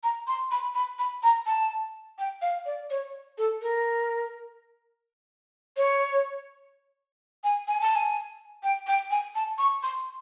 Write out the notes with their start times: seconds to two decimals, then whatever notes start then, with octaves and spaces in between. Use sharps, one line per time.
0.03 A#5
0.27 C6
0.51 B5
0.74 B5
0.99 B5
1.23 A#5
1.46 A5
2.18 G5
2.42 F5
2.66 D5
2.90 C#5
3.38 A4
3.62 A#4
5.77 C#5
7.44 G#5
7.67 G#5
7.81 A5
7.95 G#5
8.63 G5
8.87 G5
9.11 G#5
9.35 A5
9.58 C#6
9.83 C6